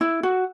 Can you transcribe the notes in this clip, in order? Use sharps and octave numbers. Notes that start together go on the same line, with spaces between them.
E4
F#4